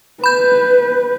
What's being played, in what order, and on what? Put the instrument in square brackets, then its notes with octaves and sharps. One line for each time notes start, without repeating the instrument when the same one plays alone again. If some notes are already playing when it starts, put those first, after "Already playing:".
[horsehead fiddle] B4 [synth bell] B5 G6